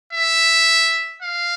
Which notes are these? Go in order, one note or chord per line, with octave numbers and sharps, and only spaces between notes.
E5
F5